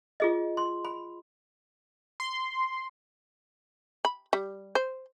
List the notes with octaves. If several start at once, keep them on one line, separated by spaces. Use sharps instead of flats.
F4 G#4 D#5
C6
B5
C6
B5
G3
C5